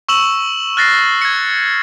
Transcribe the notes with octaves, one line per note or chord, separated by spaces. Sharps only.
C#6 E6 E7 F#7
F6 F#6 A6 A#6 C7
G#6 C#7